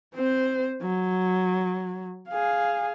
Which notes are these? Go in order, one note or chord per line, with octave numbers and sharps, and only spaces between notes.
C4 C5
F#3
G#4 F5